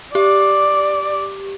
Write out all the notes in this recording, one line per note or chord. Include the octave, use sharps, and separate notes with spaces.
G4 D5